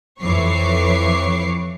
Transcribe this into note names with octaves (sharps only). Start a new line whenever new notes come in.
F2 E3 C#5 C#6 D6 C7